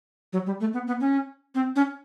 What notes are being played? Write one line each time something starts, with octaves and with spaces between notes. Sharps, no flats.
F#3
G3
A3
B3
B3
C#4
C4
C#4